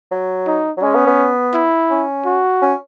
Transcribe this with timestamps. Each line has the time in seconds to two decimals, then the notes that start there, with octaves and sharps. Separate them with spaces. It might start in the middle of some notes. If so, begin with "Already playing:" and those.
0.11 F#3
0.47 D#4
0.77 F#3
0.82 G#3 C#4
0.94 B3
1.06 B3
1.54 E4
1.90 C#4
2.26 F#4
2.61 C#4